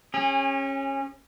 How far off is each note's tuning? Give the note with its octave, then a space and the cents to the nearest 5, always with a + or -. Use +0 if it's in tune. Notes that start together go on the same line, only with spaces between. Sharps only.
C#4 -20 G#4 -40